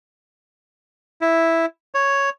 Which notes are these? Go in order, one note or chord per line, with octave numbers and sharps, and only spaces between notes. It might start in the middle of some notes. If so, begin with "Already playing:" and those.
E4
C#5